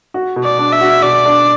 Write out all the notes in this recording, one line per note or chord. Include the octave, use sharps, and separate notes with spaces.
F#4
B2
D5
D4
E5
F#4
B2 D5
D4